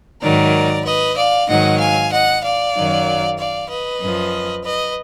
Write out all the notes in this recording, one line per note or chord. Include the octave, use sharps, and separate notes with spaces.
G#2 D#3 F#3 A#4 D5
B4 D#5
D5 F5
G#2 D#3 F#3 D#5 F#5
F5 G#5
D#5 F#5
D5 F5
F#2 D#3 F#3
D5 F5
B4 D#5
F#2 F3
B4 D#5